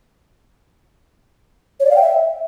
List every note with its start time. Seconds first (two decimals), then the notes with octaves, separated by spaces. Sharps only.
1.80 C#5
1.85 D5
1.91 F5
1.96 G5
2.01 E5